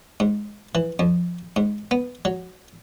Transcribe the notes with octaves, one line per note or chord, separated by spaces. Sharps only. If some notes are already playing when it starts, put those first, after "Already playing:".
G#2
E3
F2
G#2
B3
F#3